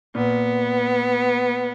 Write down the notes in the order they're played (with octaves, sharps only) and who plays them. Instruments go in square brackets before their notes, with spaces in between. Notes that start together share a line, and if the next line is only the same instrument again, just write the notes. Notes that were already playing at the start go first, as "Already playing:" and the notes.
[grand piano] A#2 [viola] B3